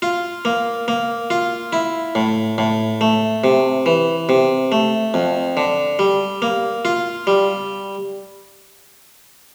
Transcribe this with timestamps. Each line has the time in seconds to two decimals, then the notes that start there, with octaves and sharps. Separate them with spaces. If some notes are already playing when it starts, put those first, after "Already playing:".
0.02 F4
0.45 A#3
0.88 A#3
1.30 F4
1.73 E4
2.15 A2
2.58 A2
3.01 A3
3.44 C3
3.86 E3
4.29 C3
4.72 A3
5.14 F2
5.57 D3
5.99 G3
6.42 A#3
6.85 F4
7.27 G3